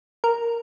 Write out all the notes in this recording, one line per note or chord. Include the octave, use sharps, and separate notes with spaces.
A#4